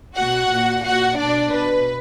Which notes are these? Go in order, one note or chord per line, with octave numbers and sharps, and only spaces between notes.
B2 F#4 F#5
A#2
A#2 F#4 F#5
B2 D4 D5
B2 B4